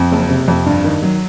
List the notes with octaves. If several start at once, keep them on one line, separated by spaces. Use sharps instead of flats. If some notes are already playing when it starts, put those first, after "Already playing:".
Already playing: F2
F#1
C3
F2
G2
D#3
F#3